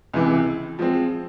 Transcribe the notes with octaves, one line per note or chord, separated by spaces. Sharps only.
C#2 C3 E3
F3 G#3 C4